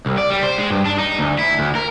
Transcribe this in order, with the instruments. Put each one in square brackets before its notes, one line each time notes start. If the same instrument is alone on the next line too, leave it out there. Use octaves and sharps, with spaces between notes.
[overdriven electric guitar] C2
D5
G3
C5
G#3
G2
D4
D#4
D2
E4
D2
A#4